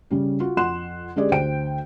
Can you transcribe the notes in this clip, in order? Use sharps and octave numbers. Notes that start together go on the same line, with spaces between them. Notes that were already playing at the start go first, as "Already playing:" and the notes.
C#3 G3 C#4
F4 F#4
F2 F#5 C6 F#6 E7
D3 G#3 C#4 G4 G#4 D5
D2 C5 G5 D7